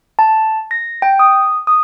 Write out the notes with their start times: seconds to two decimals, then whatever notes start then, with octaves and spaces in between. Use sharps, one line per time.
0.19 A5
0.71 A#6
1.02 G5
1.19 D#6
1.67 D#6